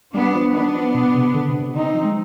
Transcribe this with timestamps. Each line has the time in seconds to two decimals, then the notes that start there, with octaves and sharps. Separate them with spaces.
0.14 G3 B3 D4
0.34 F3
0.54 D#3 B3 D4
0.75 F3
0.94 B2
1.15 C3
1.34 D3
1.48 C3
1.61 C3
1.74 D3 C4 D#4
1.94 F3
2.04 G#3